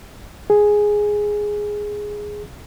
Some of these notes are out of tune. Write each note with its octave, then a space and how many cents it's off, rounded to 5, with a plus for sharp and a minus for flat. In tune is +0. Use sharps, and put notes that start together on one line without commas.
G#4 +0